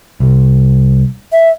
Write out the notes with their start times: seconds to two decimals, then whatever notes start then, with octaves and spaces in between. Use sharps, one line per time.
0.20 C2
1.32 E5